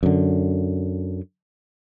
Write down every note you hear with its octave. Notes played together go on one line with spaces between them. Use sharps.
F#2 D3